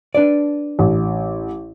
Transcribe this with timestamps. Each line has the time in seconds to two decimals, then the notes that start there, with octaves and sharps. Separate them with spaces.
0.15 D4 B4 D5
0.79 A1